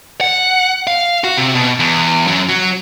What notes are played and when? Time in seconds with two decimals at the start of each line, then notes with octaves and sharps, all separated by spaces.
0.21 F#5
0.87 F5
1.24 F#4
1.37 C3
1.55 B2
1.79 E2
2.27 F#2
2.49 F#3